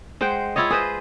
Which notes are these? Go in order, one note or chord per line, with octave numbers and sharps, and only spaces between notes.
G#3 C5 F#5 G5
E4 F4 C#5 D#5
G#4 B4 C5 D#5